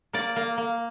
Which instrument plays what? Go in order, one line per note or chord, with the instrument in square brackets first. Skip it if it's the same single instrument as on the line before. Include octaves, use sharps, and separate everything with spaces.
[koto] A#3 D5
A#3
A#3